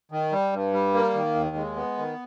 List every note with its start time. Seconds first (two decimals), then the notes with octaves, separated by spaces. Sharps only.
0.12 D#3
0.32 G3
0.52 G2
0.73 G3
0.94 A#3
1.14 D#3
1.35 D#2
1.56 G#3
1.76 B3
1.98 D#3